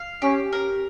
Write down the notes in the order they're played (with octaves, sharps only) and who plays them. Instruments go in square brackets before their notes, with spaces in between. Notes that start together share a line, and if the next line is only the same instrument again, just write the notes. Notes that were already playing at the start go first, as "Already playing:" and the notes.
Already playing: [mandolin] F5
[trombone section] C#4 [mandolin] G4
[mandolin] A#4